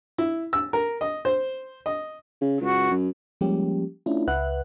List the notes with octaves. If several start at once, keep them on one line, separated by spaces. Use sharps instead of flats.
E4
E6
A#4
D#5
C5
D#5
C#3
C#2 F#4
F#2
F3 G3 G#3 A#3 C#4 G4
A3 C#4 D4 E4 F4
C#2 B4 E5 F#5 F#6